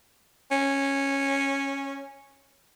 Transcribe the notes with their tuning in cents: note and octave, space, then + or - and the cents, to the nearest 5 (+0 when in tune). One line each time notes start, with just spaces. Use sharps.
C#4 -10